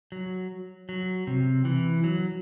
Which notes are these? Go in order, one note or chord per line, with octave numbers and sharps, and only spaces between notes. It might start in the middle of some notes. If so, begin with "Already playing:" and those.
F#3
F#3
C3
E3
F#3